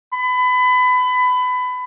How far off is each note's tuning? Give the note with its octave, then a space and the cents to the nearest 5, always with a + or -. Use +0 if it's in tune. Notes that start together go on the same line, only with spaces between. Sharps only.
B5 +25